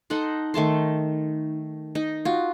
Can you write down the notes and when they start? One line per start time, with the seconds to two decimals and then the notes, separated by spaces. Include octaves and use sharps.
0.10 D#4 A4 F#5 C6
0.54 D#3 A3 A5 C6
1.95 D#4
2.25 F4 F#4